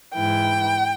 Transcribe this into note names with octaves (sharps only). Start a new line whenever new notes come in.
G#2 E3 G5